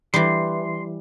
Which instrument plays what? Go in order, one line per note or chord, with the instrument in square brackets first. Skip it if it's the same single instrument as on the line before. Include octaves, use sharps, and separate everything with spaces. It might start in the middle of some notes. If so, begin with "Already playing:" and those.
[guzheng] E3 G3 [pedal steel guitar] C6